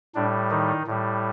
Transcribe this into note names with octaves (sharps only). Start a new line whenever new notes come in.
A2 G3 D4
D#3 D#4
A2 G3